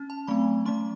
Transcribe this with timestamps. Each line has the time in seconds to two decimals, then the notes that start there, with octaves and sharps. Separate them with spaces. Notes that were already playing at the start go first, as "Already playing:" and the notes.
Already playing: C#4
0.10 A5
0.27 F#3 A3 C4 B5
0.65 F#3 A3 C#4 C6